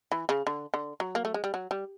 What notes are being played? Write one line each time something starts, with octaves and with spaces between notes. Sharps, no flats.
E3
C#3
D3
D3
F#3
A#3
A3
G#3
G3
F#3
G3